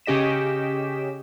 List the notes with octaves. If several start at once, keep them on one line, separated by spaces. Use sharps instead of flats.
C#3 C#4 G4 D#5 B6 E7